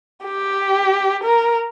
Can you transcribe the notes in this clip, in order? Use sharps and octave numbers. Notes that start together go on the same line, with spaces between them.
G4
A#4